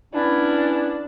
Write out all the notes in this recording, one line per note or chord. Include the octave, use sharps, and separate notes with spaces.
B3 C#4 D4 E4